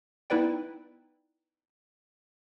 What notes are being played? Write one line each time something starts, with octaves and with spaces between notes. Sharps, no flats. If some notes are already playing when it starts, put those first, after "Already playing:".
B3 D#4 E4 B4 D5 G5